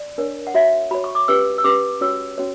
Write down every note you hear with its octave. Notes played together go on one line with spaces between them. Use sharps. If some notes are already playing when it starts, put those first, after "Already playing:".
Already playing: D5
D4 A#4 C#5
F#5
F#4 C#5 E5
F#4 C#5 B5
C#6
D6
C#4 G4 B4 E6
E6
C#4 G4 B4 D6
C#4 F#4 C#5 E6
C#4 F#4 C#5